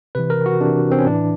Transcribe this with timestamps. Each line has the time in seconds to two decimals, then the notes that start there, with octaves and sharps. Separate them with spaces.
0.15 C3 E3 B4
0.30 A#4
0.46 F#4
0.60 C3 E3 D4
0.91 C4
0.99 C#4
1.06 A2 E3 D4